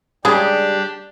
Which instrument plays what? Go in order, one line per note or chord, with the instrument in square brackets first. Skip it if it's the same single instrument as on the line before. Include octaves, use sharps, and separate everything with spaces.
[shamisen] C#3 G#3 G#4 [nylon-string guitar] G3 [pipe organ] D4 G4